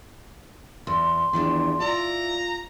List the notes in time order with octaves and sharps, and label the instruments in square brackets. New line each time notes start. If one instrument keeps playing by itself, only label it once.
[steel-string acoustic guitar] E2 [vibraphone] C6
[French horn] E2 [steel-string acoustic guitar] D#3 F3 D4
[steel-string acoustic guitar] E4 D5 [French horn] F4 [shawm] A#5